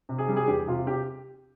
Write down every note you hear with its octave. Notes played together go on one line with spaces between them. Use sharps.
C3
G#4
G3
G#4
E2 G4
C3 F4
G4